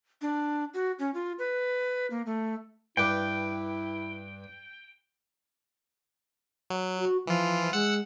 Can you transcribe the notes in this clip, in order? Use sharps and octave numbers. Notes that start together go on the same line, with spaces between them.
D4
F#4
C#4
F4
B4
A#3
A3
G2 E4 B4 G5 D6
F#3
F#4
E3 F3 F4
G#3 F#5 E6 C#7